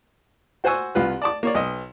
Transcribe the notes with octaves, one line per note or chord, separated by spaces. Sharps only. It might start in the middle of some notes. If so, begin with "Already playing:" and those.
F#4 C5 F#5 G#5 C#6 E6
C2 F4 B4
D5 A5 D6
A#3 C#5 D5
B1 D#5